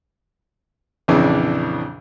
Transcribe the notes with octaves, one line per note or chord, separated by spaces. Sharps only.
A#1 F2 C#3 E3 D4